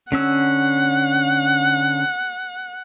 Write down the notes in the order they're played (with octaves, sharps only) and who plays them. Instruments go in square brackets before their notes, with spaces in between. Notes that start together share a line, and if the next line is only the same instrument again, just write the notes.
[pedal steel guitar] D3 C#4 E6 [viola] F#5